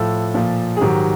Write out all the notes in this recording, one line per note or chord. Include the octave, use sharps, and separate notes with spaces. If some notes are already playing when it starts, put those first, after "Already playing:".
Already playing: A2 F3 A4
A#2 F3
G#4
G#2 D#3 F#3 G4